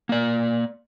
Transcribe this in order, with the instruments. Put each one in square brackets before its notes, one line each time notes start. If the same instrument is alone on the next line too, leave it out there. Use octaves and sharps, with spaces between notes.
[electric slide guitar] A#3 D5